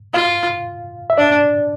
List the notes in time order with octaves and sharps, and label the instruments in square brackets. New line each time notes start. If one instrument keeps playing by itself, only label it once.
[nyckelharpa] F4 [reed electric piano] F5
[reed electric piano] E5
[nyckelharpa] D4 [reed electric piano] D5